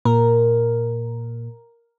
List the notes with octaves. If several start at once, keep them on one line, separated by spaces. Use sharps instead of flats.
A#2 A#4